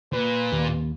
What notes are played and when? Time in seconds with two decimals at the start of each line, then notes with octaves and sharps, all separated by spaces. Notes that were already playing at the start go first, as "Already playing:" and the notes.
0.13 A#2 B4
0.52 D#2